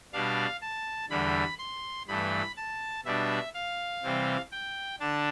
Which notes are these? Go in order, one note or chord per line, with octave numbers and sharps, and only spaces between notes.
B2 G3 D4 F5
A5
E2 D3 G3 B5
C6
G2 E3 A3 B5
A5
B2 G3 D4 E5
F5
C3 E3 G3 C4
G5
D3 D4 A5